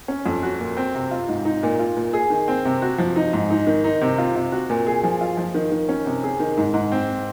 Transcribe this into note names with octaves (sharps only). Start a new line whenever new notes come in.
C#4
F2
F#4
A#2
C4
C3
F4
G#2
D#4
A#2
F4
A#2
G#4
D#3
C4
C3
F#4
F3
D#4
G#2
D#4
D#3
D#4
C3
F4
C3
F#4
A#2
G#4
F3
F4
F3
D#3
D#3
C#4
C3
G#4
D#3
G#2
G#2
C4